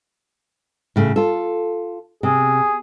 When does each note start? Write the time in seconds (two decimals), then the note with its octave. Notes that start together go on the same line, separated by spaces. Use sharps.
0.96 A2 C#3 A3
1.16 F4 A4
2.23 C3 G#4